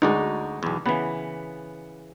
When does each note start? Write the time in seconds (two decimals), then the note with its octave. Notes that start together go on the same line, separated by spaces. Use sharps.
0.02 D2 G#3 D#4 F#4 D5
0.63 B1 E2
0.86 C#3 E3 B3